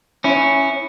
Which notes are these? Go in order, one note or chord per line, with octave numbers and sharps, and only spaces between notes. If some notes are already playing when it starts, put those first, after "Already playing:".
C#4 E4